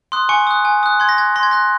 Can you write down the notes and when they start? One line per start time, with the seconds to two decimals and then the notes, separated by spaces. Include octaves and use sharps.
0.12 C6 D#6 F#6
0.29 G#5 C#6 C#7
0.47 D#6 F#6
0.65 G#5
0.83 D#6 F#6
1.00 C6 G#6
1.09 A#6
1.18 F#6 G#6
1.36 C6 A#6
1.43 G#6
1.51 F#6 A#6